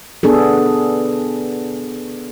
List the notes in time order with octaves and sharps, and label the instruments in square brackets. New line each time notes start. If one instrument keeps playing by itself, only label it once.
[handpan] B3 D4 G#4 A4